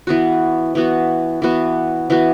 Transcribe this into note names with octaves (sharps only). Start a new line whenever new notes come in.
E3 B3 F#4
E3 B3 F#4
E3 B3 F#4
E3 B3 F#4